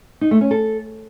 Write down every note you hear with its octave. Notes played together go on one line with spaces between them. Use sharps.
D#4
A3
C#4
A4